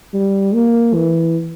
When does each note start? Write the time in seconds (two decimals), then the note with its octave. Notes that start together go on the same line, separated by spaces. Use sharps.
0.14 G3
0.54 A#3
0.94 E3